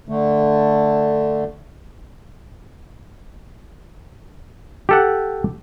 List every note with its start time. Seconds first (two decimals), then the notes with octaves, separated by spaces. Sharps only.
0.09 D3 A3
4.89 G4 A4 F#5